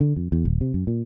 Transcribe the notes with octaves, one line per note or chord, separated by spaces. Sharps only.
D3
F2
E2
D#1
C3
F#2
A#2